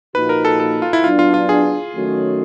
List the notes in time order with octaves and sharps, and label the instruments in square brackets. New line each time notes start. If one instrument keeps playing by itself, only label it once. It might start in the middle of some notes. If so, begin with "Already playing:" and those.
[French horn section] A#2 F3 A#3 D#4 F#4 [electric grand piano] B4
[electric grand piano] A#4
A4
A4
F4
E4
[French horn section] F#3 B3 D4 [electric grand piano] F4
[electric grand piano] F4
F4
G#4
[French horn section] D#3 F#3 A3 C#4 F#4